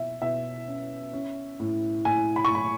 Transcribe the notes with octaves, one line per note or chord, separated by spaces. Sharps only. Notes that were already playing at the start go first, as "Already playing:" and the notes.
Already playing: B2 E5
B2 E5
C#4
C#4
A2
A2 G#5
B5
C#6
A2 B5